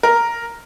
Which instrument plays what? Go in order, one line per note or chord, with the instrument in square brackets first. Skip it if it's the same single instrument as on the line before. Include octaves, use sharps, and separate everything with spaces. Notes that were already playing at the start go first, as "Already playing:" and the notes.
[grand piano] A#4